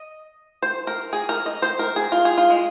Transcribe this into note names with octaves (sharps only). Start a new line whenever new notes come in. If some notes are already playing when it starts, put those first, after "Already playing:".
Already playing: D#5
C5
A#4
G#4
A#4
D#5
C5
A#4
G#4
F4
G#4
F4
G#3